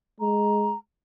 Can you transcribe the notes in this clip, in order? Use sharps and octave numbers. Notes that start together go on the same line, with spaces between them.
G#3 A#5